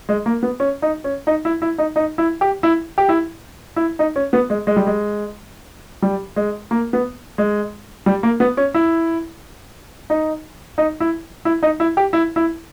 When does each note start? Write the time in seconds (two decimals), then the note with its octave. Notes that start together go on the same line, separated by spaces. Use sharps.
0.09 G#3
0.26 A#3
0.43 B3
0.60 C#4
0.82 D#4
1.04 C#4
1.27 D#4
1.45 E4
1.62 E4
1.78 D#4
1.96 D#4
2.18 E4
2.41 G4
2.63 E4
2.98 G4
3.09 E4
3.76 E4
3.99 D#4
4.16 C#4
4.33 B3
4.50 G#3
4.67 G#3
4.76 G3
4.87 G#3
6.02 G3
6.36 G#3
6.71 A#3
6.93 B3
7.38 G#3
8.06 G3
8.23 A#3
8.40 B3
8.57 C#4
8.74 E4
10.10 D#4
10.78 D#4
11.00 E4
11.45 E4
11.63 D#4
11.80 E4
11.97 G4
12.13 E4
12.36 E4